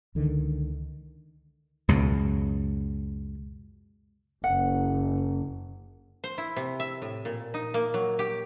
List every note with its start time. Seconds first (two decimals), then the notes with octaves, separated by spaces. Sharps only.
0.15 C#2 D3 D#3
1.89 C#2 F#2 B2
4.44 F#1 F#5
6.24 C5
6.38 E4
6.56 C3
6.80 E5
7.02 A2
7.25 A#2
7.54 D#4
7.74 A#3
7.94 F#3
8.19 G4